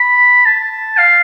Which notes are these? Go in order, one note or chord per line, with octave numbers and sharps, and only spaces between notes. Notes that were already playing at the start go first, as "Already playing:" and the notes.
Already playing: B5
A5
F5